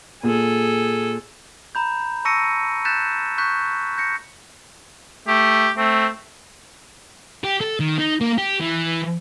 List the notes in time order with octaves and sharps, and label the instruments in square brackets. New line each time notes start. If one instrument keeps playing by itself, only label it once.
[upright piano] A#2 [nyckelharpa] G#4 A4
[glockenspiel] A#5 B5 G6
A5 C#6 E6 A#6 C#7 D#7
F#6 G6 A6 B6 E7
C#6 F#6 G6 B6
G6 A#6 C#7
[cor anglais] A3 [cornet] G4
[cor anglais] A3 [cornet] C4
[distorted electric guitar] G4
A4
D#3
D#4
A#3
G4
E3